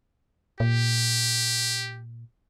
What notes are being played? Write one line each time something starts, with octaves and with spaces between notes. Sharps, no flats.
A#2 G4